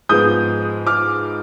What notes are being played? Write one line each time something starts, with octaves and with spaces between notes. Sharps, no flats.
G#2 F3 G#3 B3 D#6 G6
D6 F6